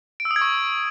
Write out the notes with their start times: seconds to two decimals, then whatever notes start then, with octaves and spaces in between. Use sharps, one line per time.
0.20 D7
0.25 E6
0.31 D#6
0.36 G#6
0.41 C#6